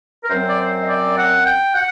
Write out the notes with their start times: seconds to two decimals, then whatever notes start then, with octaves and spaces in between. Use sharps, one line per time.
0.24 A#4
0.29 F#2 F#3 C4 C5
0.48 D5
0.59 C5
0.82 D#5
0.88 D5
1.17 F#5
1.45 G5
1.75 F#5